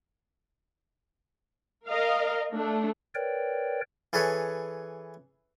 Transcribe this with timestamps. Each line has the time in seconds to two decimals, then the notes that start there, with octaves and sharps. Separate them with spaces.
1.87 A#4 D#5 F5
2.55 A3 D4
3.15 A#4 B4 C#5 D5 G5
4.13 E3 G#4 A4 B4 C#5